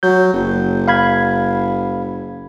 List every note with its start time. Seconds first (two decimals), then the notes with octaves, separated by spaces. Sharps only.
0.03 F#3 G6
0.34 F#1
0.88 F5 B5 G#6